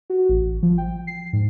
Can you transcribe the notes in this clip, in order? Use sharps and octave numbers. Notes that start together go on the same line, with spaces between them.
F#4
A1
F3
G5
C7
G#2